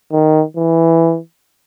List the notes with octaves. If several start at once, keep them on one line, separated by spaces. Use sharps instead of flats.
D#3
E3